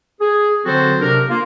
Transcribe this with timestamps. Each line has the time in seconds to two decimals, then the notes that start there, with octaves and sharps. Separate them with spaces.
0.21 G#4
0.65 D3 F#3 C4 F#4 A4 C5
1.00 C3 D4 A#4
1.29 A#3 F4